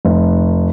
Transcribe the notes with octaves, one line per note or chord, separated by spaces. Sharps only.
F1